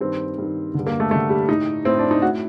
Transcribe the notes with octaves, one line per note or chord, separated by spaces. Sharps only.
G2 D#3 C4
G2 D#3
G2 D3
A#3
A3
G2 D3 A3
G3
A2 D#4
A2 C4
D4
D#4
A2 F#4